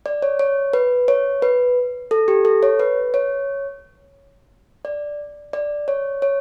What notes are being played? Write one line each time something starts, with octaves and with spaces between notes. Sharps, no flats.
D5
C#5
C#5
B4
C#5
B4
A4
G4
A4
C#5
B4
C#5
D5
D5
C#5
C#5